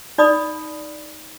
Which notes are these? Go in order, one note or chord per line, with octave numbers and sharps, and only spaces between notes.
D#4 D5 B5 D#6